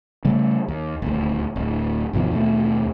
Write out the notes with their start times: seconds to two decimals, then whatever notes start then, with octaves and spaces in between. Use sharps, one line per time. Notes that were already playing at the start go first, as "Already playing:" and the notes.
0.25 C#3 G3 A3
0.68 D#2
1.02 D#1 D2
1.56 D1
2.13 G1 D#2 B2 F3
2.31 D#2 B2 A3